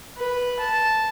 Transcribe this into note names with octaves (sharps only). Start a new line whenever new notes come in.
B4
A5